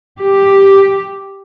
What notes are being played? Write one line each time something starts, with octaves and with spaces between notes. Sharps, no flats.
G4